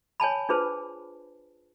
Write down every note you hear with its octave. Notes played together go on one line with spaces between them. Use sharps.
C#5 G#5 A5 B5
D4 F4 G#4 B4 C5 A5